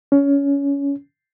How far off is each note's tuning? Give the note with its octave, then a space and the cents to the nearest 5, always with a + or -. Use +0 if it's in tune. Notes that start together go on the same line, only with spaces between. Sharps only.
C#4 +20